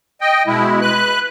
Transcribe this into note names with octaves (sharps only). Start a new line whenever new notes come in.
D#5 G5
B2 G#3 E4
B4 F#6